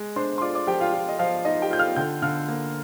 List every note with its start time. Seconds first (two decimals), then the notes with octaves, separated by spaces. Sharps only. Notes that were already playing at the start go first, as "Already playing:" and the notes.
Already playing: G#3
0.16 D4 C5 C6
0.38 C6
0.41 F4 D5 D6
0.55 D5 D6
0.67 F3 G4 G5
0.80 F4 F5
0.93 F4
1.08 D#5
1.19 F3 F4 F5
1.45 D#4 F4 D#5
1.62 G4 G5
1.71 F4 G6
1.79 F5 F6
1.96 D3 G5 G6
2.22 D3 F5 F6
2.48 A#3